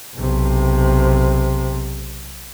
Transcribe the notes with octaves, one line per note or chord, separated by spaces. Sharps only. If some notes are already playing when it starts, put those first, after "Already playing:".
B1 C3